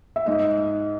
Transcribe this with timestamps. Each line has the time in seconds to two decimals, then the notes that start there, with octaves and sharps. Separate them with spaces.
0.16 E5
0.26 G#2 D#5